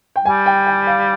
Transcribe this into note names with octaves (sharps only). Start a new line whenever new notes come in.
G5
G3 G#5
G5
G5
F5